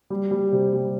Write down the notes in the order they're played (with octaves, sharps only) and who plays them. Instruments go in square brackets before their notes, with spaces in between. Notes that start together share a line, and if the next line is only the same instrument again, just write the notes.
[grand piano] G3
G3
C3
G3